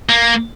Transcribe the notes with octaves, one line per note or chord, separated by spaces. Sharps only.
A#3